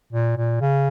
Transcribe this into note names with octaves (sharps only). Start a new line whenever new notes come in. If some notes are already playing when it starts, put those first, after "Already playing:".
A#2
A#2
C#3